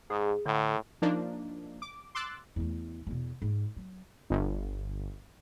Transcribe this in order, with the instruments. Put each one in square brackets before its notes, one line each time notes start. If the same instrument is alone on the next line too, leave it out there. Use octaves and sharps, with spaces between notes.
[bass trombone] G#2 [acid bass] G#4
[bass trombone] A2 [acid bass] D3
[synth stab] F3 A#3 D4 D#4
D6
C6 D6 E6 F#6 A6
[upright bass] E2 A3
E2 B2
G#2
F#3
[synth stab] G1